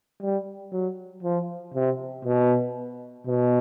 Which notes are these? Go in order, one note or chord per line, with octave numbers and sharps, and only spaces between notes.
G3
F#3
F3
C3
B2
B2